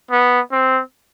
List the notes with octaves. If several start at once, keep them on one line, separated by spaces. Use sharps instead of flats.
B3
C4